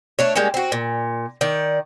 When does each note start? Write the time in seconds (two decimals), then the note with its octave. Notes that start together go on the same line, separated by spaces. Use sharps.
0.19 A3 D4 C#5
0.35 G3 G#3 A#3 C#4
0.54 C4 F#4
0.72 A#2
1.41 D#3 D5